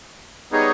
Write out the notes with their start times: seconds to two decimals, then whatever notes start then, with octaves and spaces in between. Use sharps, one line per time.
0.52 G3 B3 D#4 G#4 C#5